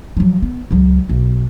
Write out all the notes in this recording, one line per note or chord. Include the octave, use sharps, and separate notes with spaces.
F3 F#3
B3
C#2 F#3
B1